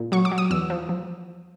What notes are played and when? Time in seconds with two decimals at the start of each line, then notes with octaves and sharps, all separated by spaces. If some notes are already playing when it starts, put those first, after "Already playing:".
Already playing: A#2
0.12 F#3 C#6
0.25 D6
0.31 F#3
0.38 D#6
0.51 E2 E6
0.70 F3
0.89 F3